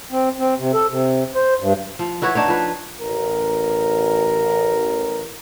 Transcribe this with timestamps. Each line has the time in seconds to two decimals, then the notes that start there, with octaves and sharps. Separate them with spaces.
0.11 C4
0.38 C4
0.58 C3
0.74 A4
0.90 C3
1.35 C5
1.60 G2
1.99 F3
2.22 E4 F#4 B4 C#5
2.35 D4 D#4 C#5
2.48 F3 B4
3.00 A1 A#4